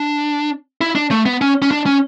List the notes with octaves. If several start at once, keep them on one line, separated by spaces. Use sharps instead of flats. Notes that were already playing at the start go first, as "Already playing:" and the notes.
Already playing: D4
E4
D4
A3
B3
C#4
C#4
D4
C#4